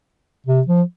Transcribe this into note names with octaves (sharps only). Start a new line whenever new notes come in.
C3
F3